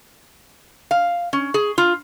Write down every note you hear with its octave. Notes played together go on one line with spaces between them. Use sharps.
F5
C#4
G#4
F4